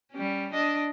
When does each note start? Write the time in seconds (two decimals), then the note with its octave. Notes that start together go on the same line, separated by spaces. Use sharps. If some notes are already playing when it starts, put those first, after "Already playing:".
0.12 G3 C#4
0.52 D4 D#5